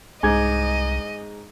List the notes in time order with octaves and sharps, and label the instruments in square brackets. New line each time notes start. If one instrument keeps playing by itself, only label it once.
[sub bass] C2 [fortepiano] G#2 [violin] D#5 [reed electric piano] G#5 D6 G#6